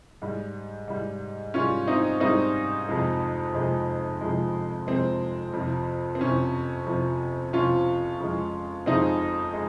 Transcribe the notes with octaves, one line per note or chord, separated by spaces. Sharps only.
G#2 G3
G#2 G3
G#2 G3 C#4 F4
C4 D#4
G#2 G3 C4 D#4
F2 C3 F3 G#3
F2 C3 F3 G#3
F2 C3 F3 G#3
F2 C3 F3 G#3 C4
F2 C3 F3
C4
F2 C3 F3 C#4
F2 C3 F3
F2 C3 F3 C#4 F4
F2 C#3 F3 G#3
F2 C#3 F3 G#3 C4 D#4
G#3